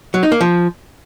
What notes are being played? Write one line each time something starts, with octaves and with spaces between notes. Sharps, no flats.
F#3
D#4
A#3
F3